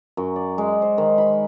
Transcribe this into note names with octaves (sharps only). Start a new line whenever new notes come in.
F#2
D5
G#3
C5
D#3
B5